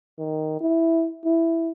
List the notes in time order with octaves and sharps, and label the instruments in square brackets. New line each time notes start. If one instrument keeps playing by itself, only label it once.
[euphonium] D#3
E4
E4